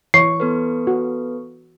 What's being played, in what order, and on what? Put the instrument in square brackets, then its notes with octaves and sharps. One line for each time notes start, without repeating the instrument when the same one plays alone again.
[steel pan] E3 C#5 [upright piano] C#6 [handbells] C7
[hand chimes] B3 A4 B4
[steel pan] F#4